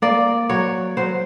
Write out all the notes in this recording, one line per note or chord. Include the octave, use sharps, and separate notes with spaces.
A#3 D5
F#3 C#5
F#3 C5